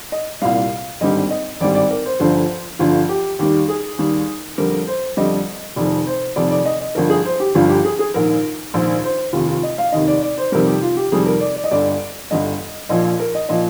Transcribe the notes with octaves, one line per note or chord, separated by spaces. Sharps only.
D#5
C2 A#2 G3 F5
G#1 G2 D3 G3 D#5
D#5
G#1 G2 D3 G3 D5
D5
A#4
C5
G1 G2 D3 F3 C5
G1 G2 D3 F3 F4
G4
D#2 D#3 G3 G4
G#4
D#2 D#3 G3
F2 D3 G3 A#4
C5
F2 D3 G3 D#5
F1 F2 D#3 D5
C5
F1 F2 D#3 D5
D5
D#5
D#5
G1 G2 F3 A#4
G#4
C5
G4
G1 G2 F3 F4
G4
G#4
G#4
A#1 G#2 D#3 A#4
A#1 G#2 D#3 C5
C5
F1 D#2 D#3 F4
F4
D#5
F5
F1 D#2 D#3 D#5
D5
D5
C5
F2 C3 D#3 G3 A#4
G4
F4
G4
F2 C3 D#3 G3 G#4
A#4
D5
D5
D#5
G1 G2 D3 D5
G1 G2 D3 D#5
A#1 A#2 F3 D#5
A#4
D#5
A#2 F3 D#5